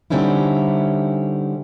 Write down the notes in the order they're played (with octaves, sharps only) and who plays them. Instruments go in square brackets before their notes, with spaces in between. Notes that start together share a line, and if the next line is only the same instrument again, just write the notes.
[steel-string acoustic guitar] D3 G3 C4 C#4 D#4 E4